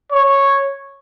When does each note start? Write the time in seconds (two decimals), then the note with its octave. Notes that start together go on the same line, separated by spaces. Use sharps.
0.12 C#5